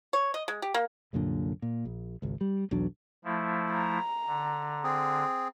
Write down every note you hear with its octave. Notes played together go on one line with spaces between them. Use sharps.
C#5
D#5
G#3
G4
A#3
C2 F#2 A#2 D3
A#2
A#1
G#1 C#2
G3
B1 E2 F#3 D4
F3 A3 E4
A#5
D3
C4 G#4